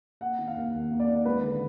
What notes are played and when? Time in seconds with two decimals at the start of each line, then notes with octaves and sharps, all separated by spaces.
0.21 A#3 F#5
0.38 D#3
0.48 F5
0.56 D#2
0.74 D#2
0.91 A#3
1.00 D5
1.08 D#3
1.25 G#3 B4
1.44 D3